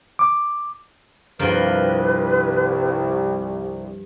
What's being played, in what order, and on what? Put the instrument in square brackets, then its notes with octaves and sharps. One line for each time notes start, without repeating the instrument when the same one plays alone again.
[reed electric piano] D6
[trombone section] C2 [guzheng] G2 F3 A#4 [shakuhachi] B4